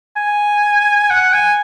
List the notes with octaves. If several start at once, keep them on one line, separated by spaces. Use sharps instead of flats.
G#5
F#5
G#5